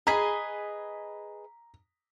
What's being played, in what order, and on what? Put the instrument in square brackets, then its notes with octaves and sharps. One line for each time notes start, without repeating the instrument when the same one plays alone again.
[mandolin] G#4 B4 D#5 [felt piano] A#5 B6